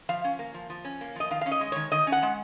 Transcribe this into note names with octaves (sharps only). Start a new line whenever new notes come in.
F3 F5
C#4
A#3
F3
F3
C#4
A#3
F3 D#5
D#3 F5
C#4 F5
D#5
G#3
D#3 C#5
D#3 D#5
C#4
F#5
G#3